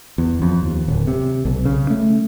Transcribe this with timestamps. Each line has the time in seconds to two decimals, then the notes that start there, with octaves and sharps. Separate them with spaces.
0.18 E2
0.42 F2
0.63 D#2
0.88 D1
1.07 C3
1.45 B1
1.65 C#3
1.90 A3